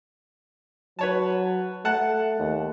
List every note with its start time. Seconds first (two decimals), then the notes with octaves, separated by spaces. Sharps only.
0.99 F#3 B4 C#5 A5
1.85 A3 F#5 A5 F#6
2.40 D#2